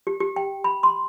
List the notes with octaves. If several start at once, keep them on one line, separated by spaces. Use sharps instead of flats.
G4
G4
G5
B5
C6